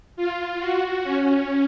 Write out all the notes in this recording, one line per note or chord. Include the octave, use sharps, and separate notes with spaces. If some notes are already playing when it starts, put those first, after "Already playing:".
F4
F#4
C#4